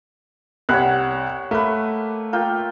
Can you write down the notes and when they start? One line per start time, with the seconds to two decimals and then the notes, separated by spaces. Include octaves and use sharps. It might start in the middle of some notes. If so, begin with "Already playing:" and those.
0.69 C2 C#5 F#5 B5 F#6
1.51 A3 A#3 B4
2.33 A#3 F4 G5